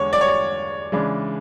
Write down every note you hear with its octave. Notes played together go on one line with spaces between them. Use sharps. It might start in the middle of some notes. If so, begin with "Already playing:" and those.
Already playing: E2 D3 G#3 C#5
D5
C#5
D5
C#3 E3 G#3 D4